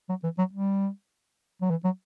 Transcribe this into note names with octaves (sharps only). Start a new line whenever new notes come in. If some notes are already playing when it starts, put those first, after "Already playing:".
F#3
E3
F#3
G3
F#3
E3
F#3